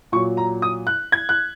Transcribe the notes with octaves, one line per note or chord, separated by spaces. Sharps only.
A#2 F#3 C#6
A#5
D#6
F#6
G#6
F#6